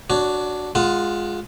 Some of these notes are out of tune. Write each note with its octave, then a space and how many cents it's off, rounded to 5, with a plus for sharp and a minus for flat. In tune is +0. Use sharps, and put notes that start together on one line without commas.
D4 +0 F#4 +0 C#5 +25
G#3 +0 F4 +15 F#5 +0